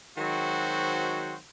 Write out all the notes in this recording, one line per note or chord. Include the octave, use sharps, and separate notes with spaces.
D#3 F#3 G#3 C4 F#4 C5